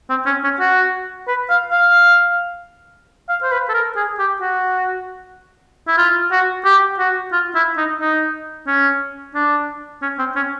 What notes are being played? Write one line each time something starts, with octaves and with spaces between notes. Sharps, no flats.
C4
C#4
C#4
F#4
B4
F5
F5
F5
C5
B4
A4
A#4
G#4
G4
F#4
E4
F4
F#4
G4
F#4
F4
E4
D#4
D#4
C#4
D4
C#4
C4
C#4